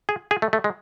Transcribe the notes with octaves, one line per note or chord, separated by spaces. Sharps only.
G#4
G#4
A3
A3
G#3